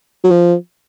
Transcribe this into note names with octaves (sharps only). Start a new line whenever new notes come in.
F#3
F3